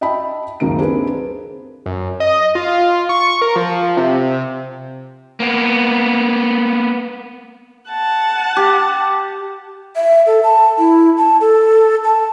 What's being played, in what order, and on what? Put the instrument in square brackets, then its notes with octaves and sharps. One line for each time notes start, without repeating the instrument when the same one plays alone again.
[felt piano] D#5 E5 G5 A5 B5
F#1 C#2 D#3 A#3 D#4 D7
C4 D4 G#4 A#4 B4
[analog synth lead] F#2
D#5
F4
C#6
A#4
F3
C3
[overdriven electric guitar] A#3 B3
[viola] F#5 A5
[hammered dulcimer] G4
[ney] E5
A4
A5
E4
A5
A4
A5